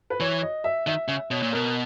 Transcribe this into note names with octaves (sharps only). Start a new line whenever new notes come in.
B4
E3 C#5
D#5
E5
D#3 E5
C#3 E5
B2 C#5
A#2
B2 A#4